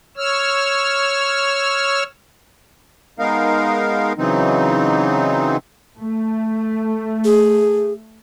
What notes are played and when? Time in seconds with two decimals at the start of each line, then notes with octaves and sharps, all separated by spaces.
0.17 C#5 E6 F6
3.19 G#3 B3 D#4 A#4 F5
4.18 C#3 E3 F#3 C4 D#4
5.99 A3
7.25 G#4